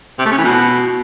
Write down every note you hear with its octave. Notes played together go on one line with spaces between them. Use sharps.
C3
A3
C#4
E3
B2